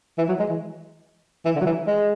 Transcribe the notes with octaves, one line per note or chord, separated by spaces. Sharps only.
E3
F#3
G#3
E3
E3
D3
F#3
E3
G#3